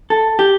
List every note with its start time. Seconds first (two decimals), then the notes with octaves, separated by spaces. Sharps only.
0.10 A4
0.39 G4